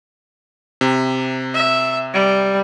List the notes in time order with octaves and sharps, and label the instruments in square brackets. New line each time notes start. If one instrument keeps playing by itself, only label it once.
[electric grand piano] C3
[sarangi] E5
G3